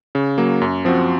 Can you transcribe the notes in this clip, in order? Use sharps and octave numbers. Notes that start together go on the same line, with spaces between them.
C#3
F#3 A#3
F#2
F3 C4 F#4